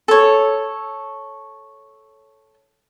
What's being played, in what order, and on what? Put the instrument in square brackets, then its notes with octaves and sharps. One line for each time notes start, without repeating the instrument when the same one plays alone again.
[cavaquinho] A4 C#5